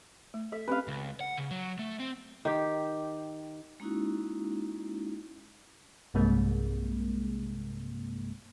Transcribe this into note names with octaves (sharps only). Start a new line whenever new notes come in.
A3
A4 E5
C4 C#4 G4 B4 F5
C#2
F#5
C#3
F#3
A3
C4
D#3 G4
G#3 A#3 C#4 D#4 E4 F#4
B1 G2 C3 G#3 A#3